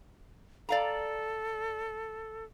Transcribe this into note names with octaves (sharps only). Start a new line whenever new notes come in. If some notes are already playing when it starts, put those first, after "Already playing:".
A4 D5 F5 A#5